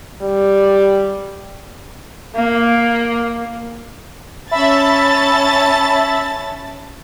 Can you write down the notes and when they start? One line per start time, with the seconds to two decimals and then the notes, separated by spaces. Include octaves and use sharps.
0.21 G3
2.35 A#3
4.51 C#4 E5 A5 B5 A6